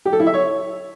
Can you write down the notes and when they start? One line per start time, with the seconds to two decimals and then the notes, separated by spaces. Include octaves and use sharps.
0.05 G4
0.13 A4
0.20 E4
0.27 E5
0.34 C#5